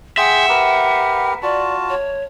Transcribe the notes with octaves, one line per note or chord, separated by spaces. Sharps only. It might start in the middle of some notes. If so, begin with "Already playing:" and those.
G#4 E5 F#5 G5 C6
G4 A#4 B4
F4 F#4 D5 A5
C#5